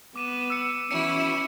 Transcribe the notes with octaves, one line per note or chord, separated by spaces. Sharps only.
B3 D6 D#7 E7
E6 C#7
E3 C#4 E4 F#4 C#7